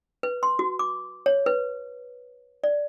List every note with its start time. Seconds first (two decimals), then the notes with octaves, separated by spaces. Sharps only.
0.23 B4
0.43 C6
0.59 F#4
0.79 D6
1.26 C#5
1.46 B4
2.64 D5